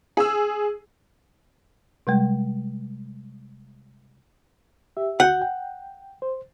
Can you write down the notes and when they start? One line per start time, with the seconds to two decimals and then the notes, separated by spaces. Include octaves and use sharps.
0.17 G#4 E6
2.07 C3 G3 G#3
4.97 G4 E5
5.20 D2 F#4 F#5 G6
5.42 G5
6.22 C5